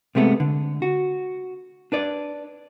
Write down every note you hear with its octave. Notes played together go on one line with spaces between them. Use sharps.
C3 G#3 A3 B3
D3
F#4
D4 B4 D5